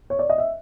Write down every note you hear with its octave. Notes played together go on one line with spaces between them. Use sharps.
C#5
D5
D#5
E5